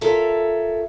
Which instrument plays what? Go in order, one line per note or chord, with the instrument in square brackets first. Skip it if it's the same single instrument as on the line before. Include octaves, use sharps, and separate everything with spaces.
[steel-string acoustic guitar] F4 A4 A#4 C#5 E5